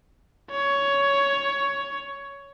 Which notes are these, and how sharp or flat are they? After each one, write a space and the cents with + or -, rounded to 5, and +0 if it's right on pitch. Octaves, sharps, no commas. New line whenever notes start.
C#5 +10